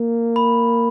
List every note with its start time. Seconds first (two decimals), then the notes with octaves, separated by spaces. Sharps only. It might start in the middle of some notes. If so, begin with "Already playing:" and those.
Already playing: A#3
0.36 B5